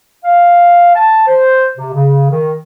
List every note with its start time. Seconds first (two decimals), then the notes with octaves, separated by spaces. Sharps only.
0.25 F5
0.96 A5
1.28 C5
1.78 C3
1.94 C#3
2.31 D#3